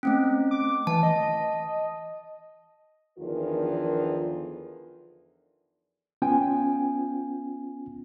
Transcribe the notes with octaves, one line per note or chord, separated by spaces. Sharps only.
A3 C4 C#4
D6
E3 A5
D#5
E2 D3 D#3 F3 F4 A#4
B3 C#4 F4 G5 G#5